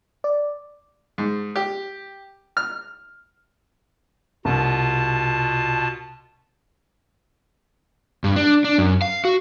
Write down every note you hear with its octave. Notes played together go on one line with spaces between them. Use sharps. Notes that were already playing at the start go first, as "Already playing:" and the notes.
D5
G#2
G4
F6
C2 B2 F4 A5
G2
D4
D4
F#2
F5
F#4